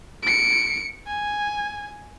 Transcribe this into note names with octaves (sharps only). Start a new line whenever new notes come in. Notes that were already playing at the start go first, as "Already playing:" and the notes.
C#7 D7
G#5